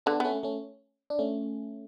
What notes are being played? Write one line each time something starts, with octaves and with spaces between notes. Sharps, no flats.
D3 B3 D4
A3 B3 C#4
A3 C#4
D4
A3 C#4